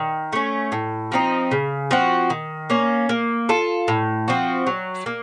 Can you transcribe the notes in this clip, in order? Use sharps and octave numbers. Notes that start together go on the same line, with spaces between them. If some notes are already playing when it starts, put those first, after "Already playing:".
Already playing: D#3
A3 C#4
A2
F3 C4 D#4
C#3
F3 C4 F#4
D#3
A#3 C#4
A#3
F4 A4
A2
F3 C4 F#4
F#3
A#3